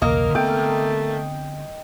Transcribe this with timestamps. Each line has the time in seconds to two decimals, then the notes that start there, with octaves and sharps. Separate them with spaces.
0.02 B1 E2 C#3 A#3 A#4 D#5
0.35 D3 A3 B3 C4 G5